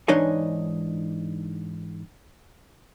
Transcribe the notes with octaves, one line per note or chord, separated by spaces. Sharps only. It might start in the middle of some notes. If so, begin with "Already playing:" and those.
G#2 E3 D4 D#4 C#5 D#5